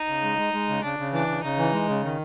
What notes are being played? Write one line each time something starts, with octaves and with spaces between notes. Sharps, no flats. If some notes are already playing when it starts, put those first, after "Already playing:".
Already playing: D#4
C#3
G#3
G#3
G#3
C#3
C#3 D4
C#3
E3 D4
C#3
C#3 D#4
E3
G#3
C#3
D#3